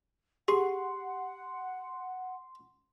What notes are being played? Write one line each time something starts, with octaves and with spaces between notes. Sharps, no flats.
G4 G#4 F#5 C6